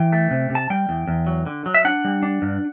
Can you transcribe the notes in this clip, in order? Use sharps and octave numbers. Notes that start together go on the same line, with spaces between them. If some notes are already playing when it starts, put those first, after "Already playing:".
Already playing: E3 G5
A3
C3
C3
A5
G3 G5
E2
E2
F#3
D3
F#3
E5
D4 F#5
G3
D4
G2